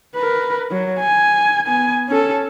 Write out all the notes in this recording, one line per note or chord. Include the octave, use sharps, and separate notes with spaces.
A#4 B4
F#3
G#5
B3 G#5
C#4 A4